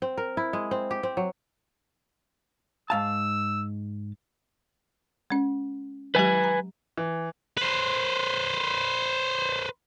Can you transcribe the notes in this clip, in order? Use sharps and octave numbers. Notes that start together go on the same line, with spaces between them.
C4
A#4
E4
G#3
C4
G4
C4
F#3
G#2 F5 A5 E6
G#3 C#4
F#3 G#3 G4 B4 G#5
A#5
E3
B4 C5